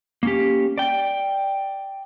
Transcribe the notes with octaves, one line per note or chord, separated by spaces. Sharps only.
A#3 C#4 G4
D5 G5